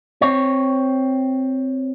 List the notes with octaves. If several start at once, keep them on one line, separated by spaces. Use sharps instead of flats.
C4 C#5